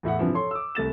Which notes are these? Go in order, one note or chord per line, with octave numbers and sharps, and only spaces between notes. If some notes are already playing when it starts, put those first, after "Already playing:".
E2 A2 E5 F#5
G2 C3 E3 F3
A4 C#5 C6
D6 E6
C2 A3 A6 E7